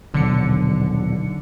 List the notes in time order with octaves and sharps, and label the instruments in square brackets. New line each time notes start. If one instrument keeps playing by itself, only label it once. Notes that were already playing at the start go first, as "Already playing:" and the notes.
[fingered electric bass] D#1 B1 [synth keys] D3 C#7